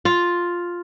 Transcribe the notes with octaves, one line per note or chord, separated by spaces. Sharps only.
F4